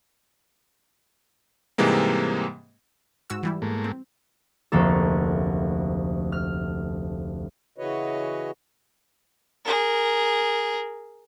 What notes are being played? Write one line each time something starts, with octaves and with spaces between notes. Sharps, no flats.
G#2 C3 E3 G3 G#3 A#3
G#2 F#4 E6
E3 G3 E4
G#2 A3 A#3
C4
F1 D2 A#3 A4
F6
C#3 E3 F#4 B4 C#5 D#5
G#4 A#4